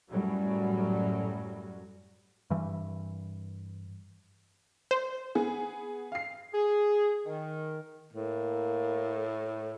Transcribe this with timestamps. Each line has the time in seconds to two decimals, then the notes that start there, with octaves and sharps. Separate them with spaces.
0.10 F#2 A2 F#3 G3
2.50 G2 E3
4.91 C5
5.35 B3 G#4
6.12 F5 C7
6.53 G#4
7.26 D#3
8.13 A2 A#3